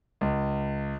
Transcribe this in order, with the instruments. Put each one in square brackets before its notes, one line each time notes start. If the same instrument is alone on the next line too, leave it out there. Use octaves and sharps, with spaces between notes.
[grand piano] C#2